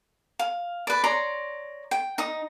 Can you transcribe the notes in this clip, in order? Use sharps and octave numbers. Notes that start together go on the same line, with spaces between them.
F5
B4 D5
C#5 D5 A#5 C6
G5
D#4 D#6